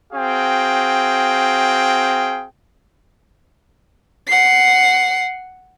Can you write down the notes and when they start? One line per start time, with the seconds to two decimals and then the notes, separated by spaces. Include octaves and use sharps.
0.13 C4 F#4 G#4 F5 G5
4.28 F#5 C7